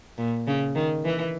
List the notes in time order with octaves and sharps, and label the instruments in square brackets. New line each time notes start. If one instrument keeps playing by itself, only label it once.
[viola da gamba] A#2
C#3
D#3
E3